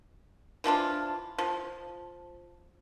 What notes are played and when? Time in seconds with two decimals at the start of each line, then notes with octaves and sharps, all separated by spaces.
0.64 E3 F3 D4 F4
1.38 F3